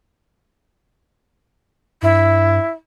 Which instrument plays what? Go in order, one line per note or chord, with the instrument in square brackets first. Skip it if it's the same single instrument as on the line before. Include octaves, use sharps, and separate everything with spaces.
[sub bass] G2 [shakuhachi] E4